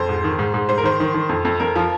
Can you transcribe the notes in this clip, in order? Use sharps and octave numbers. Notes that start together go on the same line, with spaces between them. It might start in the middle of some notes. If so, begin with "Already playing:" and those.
Already playing: F2 C5
G#2
D#3
G#2
G#2
G#2 C5
A#4
D#3 C5
D#3
D#3
F2
F2
F2 A#4
F3